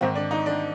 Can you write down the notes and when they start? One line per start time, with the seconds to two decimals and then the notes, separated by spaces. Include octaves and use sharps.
0.01 G#2 D#3 C4
0.15 D4
0.31 D#4
0.46 D4